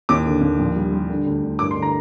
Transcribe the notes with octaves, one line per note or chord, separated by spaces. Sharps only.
D#2 D6
D3
D#2
A#1
G3
G3
D3
D2
D2
G2 D6
C6
D3
A#5